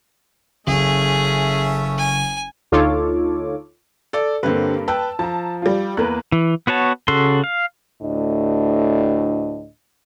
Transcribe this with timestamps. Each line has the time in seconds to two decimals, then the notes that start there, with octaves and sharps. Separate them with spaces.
0.67 F#1 A3 C#4 G#4 E5
1.98 G#5
2.72 D2 D#4 F4 A4 C#5 D6
4.13 A4 D5
4.43 G2 D3 A#3 C4 B4
4.88 B4 G5 A5 E6
5.19 F3 A5 A#5
5.62 G3 F4
5.97 E2 A#3 B4 F#6
6.32 E3
6.67 B3 F#4 C#5 A5
7.08 C#3 F#4 A4 C6
7.44 F5
8.02 D2 A2 D4 D#5